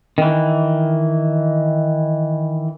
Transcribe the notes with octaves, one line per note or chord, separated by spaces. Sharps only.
D#3 E3